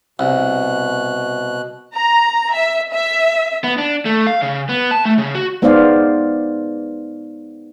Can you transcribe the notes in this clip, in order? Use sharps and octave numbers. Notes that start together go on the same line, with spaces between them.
C2 B2 F#6
A#5
E5
E5
B3
D4
A3
F5
C#3
B3
A5
A3
C#3
F#4
G#3 B3 D#4 C5 D5 F5